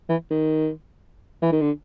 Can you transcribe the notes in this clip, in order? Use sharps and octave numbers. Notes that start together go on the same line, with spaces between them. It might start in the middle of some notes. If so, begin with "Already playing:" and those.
E3
D#3
E3
D#3
D3